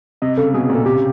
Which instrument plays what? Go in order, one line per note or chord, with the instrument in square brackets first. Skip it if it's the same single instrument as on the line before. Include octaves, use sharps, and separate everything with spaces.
[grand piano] C3 [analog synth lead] D#5
[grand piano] C#3 [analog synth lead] A4
[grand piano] B2 [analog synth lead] G#4
[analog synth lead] G#4
[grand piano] A#2
[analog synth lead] A4
[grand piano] C3 [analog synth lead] G4
[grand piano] C#3